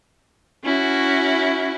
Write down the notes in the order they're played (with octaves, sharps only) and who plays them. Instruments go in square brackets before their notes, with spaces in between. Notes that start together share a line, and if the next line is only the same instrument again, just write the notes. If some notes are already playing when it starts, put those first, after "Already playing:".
[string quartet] C#4 E4 F#4